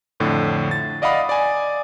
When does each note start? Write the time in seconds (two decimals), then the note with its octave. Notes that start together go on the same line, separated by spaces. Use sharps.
0.20 F2 A2 D3
0.71 A6
1.02 D5 D#5 F5 F#5 B5 D#6
1.29 D5 G#5